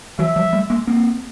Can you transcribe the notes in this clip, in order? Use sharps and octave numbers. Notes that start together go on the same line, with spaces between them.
E3 F#3 E5
F3 G3
G3 A3
G#3 A#3
A#3 C4